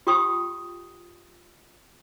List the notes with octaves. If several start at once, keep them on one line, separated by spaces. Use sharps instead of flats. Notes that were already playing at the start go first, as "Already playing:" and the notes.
F4 G4 G5 C#6 D#6